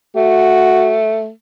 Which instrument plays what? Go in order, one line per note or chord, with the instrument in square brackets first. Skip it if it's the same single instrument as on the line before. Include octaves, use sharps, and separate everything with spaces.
[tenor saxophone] A3 [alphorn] F#4